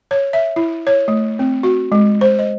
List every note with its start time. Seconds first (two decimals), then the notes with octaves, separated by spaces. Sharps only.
0.11 C#5
0.33 E5
0.56 E4
0.87 C#5
1.08 A3
1.39 C4
1.63 F#4
1.92 G#3
2.21 C5
2.39 D#5